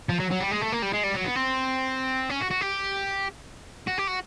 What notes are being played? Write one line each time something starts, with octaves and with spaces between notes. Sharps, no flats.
F3
F#3
F#3
G3
G#3
A3
A#3
G3
G#3
G3
F#3
B3
C4
C#4
F#4
F#4
G4
F#4
G4
F#4